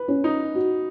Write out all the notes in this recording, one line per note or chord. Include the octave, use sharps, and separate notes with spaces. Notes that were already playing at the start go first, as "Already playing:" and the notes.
Already playing: B4
C#4
D#4
F#4